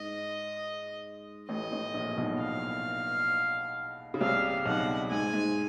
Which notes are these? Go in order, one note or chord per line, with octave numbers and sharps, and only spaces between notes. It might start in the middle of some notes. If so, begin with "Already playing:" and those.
Already playing: G#2 D#5
A1 A2 D#5
A1 A2
A#1 A#2
B1 B2
F5
C#3
C2 C3 F5
B1 B2 F#5
G#2 G#5
G#2